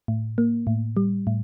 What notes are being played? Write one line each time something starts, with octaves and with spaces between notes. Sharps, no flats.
A2
A#3
A2
G3
A2